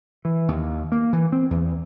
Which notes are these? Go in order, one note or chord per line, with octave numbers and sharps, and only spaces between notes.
E3
D#2
A#3
E3
C4
E2